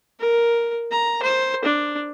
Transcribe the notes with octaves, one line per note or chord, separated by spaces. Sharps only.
A#4
A#5
C5
D4